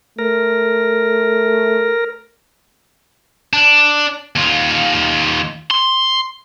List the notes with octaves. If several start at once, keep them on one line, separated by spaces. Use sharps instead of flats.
A3 A#4
D4
D#2 F4
C6